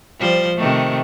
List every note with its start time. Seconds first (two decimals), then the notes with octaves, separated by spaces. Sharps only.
0.20 F3 G3 C5
0.56 C3 D#3 A3